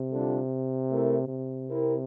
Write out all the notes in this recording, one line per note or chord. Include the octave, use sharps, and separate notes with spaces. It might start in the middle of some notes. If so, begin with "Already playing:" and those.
Already playing: C3
D3 G3 D4 F4 A4
A3 E4 A#4 E5
C3
C4 E4 A#4